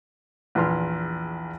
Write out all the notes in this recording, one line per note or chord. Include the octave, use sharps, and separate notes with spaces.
A#1 E2 B4 C6 F6